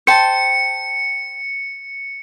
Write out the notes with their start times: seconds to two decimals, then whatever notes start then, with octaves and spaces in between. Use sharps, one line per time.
0.07 C5 G5 A5 C#7